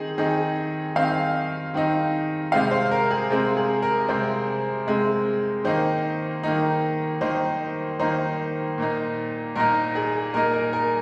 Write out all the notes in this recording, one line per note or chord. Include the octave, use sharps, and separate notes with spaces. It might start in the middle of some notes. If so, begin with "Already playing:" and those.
Already playing: D#3 C4 D#4 G#4
D#3 C4 D#4 G#4
D#3 C4 D#4 F5
D#3 C4 D#4
C3 G#3 C4 F5
C5
A#4
G#4
C3 G#3 C4
G#4
A#4
C3 G#3 C4 C5
C3 G#3 C4
D#3 A#3 D#4 C5
D#3 A#3 D#4
D#3 A#3 D#4 C5
D#3 A#3 D#4 C5
A#2 A#3 D#4
A#2 A#3 D#4 A#4
G#4
A#2 A#3 D#4 A#4
A#4
A#4